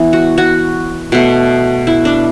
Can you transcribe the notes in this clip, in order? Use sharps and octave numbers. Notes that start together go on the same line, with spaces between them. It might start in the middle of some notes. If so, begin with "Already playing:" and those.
Already playing: E3 B3
F#4
F#4
B2 A3
E4
D4